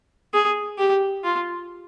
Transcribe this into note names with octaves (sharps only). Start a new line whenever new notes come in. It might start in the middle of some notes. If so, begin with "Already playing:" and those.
G#4
G4
F4